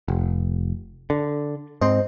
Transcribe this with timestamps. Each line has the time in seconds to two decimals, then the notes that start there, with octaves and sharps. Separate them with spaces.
0.08 F1
1.10 D3
1.81 G#2 C4 C5 D#5